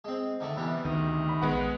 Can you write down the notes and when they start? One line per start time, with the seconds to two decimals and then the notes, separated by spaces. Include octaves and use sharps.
0.04 G#3 C4
0.40 D3 D#3 A3
0.57 C3 E3 G3 B3
0.85 D2 D#3
1.29 B5
1.41 A#1 G#3 B3 F#5